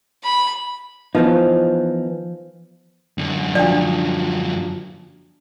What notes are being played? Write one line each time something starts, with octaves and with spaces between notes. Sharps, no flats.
B5
E3 F3 B3 D#4
F#2 D3
F3 F#3 D4 D5